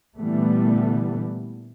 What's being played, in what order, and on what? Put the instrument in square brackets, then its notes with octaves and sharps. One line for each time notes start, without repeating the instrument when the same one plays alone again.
[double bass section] A#2 D3 E3 G3 A3 B3